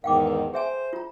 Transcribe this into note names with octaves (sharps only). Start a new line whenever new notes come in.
E2 G#2 D#3 F5 G5 D6
B4
G#4 C5 E5 G#5
F4 A#5